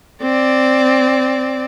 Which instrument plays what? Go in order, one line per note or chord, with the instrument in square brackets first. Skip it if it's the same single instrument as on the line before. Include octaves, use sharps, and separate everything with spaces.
[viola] C4 D5